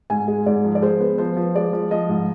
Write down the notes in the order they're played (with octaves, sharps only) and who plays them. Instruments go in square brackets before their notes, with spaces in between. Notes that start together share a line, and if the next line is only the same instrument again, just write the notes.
[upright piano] G#2 G#5
G#3
G#2 D5
F3
D5
G#3 C5
B3
F3 C5
F3
G#3 D5
F3
F3 D#5
G#2